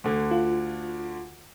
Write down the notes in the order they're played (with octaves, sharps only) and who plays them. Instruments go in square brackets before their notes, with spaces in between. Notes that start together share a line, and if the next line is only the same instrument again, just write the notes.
[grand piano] D2 D3
[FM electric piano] F4